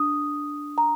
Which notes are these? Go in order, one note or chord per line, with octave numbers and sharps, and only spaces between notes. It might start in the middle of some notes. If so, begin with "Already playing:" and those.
Already playing: D4 D#6
A#5